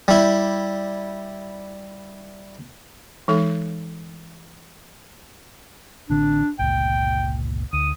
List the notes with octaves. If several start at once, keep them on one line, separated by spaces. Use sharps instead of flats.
G3 E4
E3 G#3 D#4 A4
A1 D3 C4 D4
G1 C#2 A#2 G5
D2 D#6